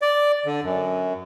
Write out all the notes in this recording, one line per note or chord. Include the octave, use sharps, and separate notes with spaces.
D5
D3
F#2